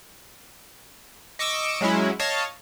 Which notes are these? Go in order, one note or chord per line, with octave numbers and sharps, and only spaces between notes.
D#5 C#6 D6 E6
F#3 G#3 C#4 E4
C#5 D#5 F5 A5